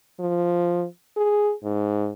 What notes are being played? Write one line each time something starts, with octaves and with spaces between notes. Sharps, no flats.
F3
G#4
G#2